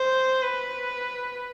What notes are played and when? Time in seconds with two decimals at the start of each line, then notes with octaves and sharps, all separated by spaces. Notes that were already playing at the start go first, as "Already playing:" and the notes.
Already playing: C5
0.42 B4